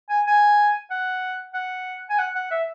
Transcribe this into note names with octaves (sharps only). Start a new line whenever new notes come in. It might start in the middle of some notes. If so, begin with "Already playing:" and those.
G#5
G#5
F#5
F#5
G#5
F#5
F#5
E5